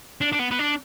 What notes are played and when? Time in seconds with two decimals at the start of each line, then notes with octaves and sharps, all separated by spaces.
0.21 D4
0.32 D4
0.39 B3
0.51 B3
0.59 D4